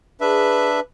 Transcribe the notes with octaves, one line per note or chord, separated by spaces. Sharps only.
D4 G#4 B4 E5